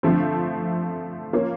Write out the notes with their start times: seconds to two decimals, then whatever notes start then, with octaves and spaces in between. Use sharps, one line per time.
0.03 D3 F3 A3 C4
1.33 A#3 C#4 F4